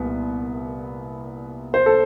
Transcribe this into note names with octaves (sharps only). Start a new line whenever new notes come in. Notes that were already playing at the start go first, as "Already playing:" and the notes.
Already playing: C2 A#2 B3
C5
A4